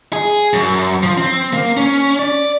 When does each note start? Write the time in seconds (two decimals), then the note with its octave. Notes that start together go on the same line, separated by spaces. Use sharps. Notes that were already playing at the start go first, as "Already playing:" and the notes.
0.13 G#4
0.53 F#2
1.03 F3
1.18 C4
1.53 A#3
1.77 C#4
2.19 D5